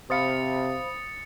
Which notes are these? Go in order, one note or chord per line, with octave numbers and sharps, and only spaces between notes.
C3 C5 F5 B5 D#6 A6 C#7